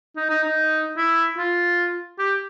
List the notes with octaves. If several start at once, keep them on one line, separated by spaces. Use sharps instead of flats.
D#4
D#4
D#4
E4
F4
G4